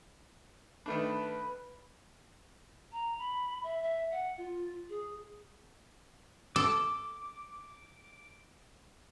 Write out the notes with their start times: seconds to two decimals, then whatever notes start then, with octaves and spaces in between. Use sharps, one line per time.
0.86 D#3 A3 D4 B4 B5
2.92 A#5
3.18 B5
3.63 E5
3.83 E5
4.11 F#5
4.38 F4
4.89 G#4
6.56 A4 D6